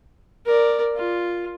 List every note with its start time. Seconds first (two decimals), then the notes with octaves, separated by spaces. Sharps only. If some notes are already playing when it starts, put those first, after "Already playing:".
0.46 A#4 D5
0.96 F4